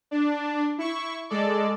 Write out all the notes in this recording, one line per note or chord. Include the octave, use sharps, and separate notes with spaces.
D4
E4 C#6
G#3 A4 D5